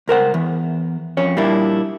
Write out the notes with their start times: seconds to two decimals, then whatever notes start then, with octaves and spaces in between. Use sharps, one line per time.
0.08 C#2 A#4 C5 F#5
0.34 E2
1.17 F2 C#4 C#5
1.37 A#2 G3 A#3 D4 E4